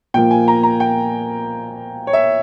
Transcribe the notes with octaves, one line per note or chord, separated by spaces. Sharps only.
A#2 F3 A#3 G5
G#5
A#5
A#5
G5
C#5
E5